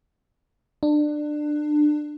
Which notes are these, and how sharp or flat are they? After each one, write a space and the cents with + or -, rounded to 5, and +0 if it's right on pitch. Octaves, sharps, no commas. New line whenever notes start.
D4 +25